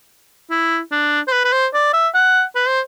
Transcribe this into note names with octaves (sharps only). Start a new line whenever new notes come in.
E4
D4
C5
B4
B4
C5
D5
E5
F#5
B4
C5